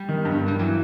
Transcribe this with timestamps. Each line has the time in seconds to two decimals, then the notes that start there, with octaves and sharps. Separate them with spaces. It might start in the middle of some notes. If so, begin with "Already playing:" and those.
Already playing: G3
0.09 D#3
0.25 G2
0.42 G2
0.48 G3
0.59 E3 F#3